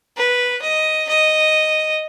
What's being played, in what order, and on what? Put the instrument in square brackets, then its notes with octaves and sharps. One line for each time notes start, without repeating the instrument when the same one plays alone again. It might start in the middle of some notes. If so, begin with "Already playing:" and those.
[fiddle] B4
D#5
D#5